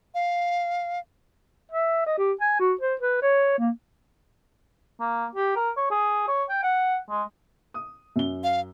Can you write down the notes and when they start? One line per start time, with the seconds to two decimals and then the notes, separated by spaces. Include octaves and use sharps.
0.14 F5
1.72 E5
2.06 D#5
2.18 G4
2.41 G#5
2.60 F#4
2.81 C5
3.01 B4
3.22 C#5
3.58 A#3
5.00 A#3
5.35 G4
5.56 A#4
5.77 C#5
5.91 G#4
6.28 C#5
6.49 G5
6.63 F#5
7.10 G#3
7.74 D#6
8.16 F#2 G7
8.44 F5